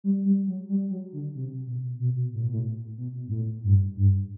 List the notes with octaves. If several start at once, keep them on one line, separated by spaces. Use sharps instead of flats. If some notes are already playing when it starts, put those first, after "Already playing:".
G3
G3
F#3
G3
F#3
D3
C3
B2
B2
A2
B2
A2
B2
G2
A2
G2
G2